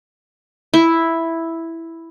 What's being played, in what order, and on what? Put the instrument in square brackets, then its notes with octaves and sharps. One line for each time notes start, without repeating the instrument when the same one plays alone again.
[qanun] E4